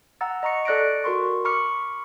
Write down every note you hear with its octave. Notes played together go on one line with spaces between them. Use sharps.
F#5 A#5 E6 A6
D#5 A#5 C#6 C#7
A4 D5 F#6 A#6 C#7 D7
F#4 A#4 C6 C#6
B5 C#6 D6 F6 C#7